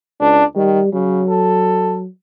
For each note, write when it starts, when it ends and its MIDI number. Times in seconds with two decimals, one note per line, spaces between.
0.21 0.42 37
0.21 0.44 62
0.56 0.80 51
0.56 0.93 55
0.93 1.23 49
0.93 2.06 54
1.29 1.98 69